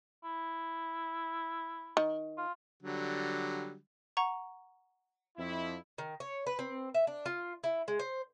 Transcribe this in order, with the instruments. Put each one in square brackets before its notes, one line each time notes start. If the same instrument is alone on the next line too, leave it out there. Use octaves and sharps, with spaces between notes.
[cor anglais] E4
[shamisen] D#3
[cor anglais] F4
[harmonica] D3 F#3 G3
[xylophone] F#5 A#5 C#6
[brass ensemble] F2 E4
[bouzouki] D#3
C#5
B4
C4
E5
D4
F4
E4
G#3
C5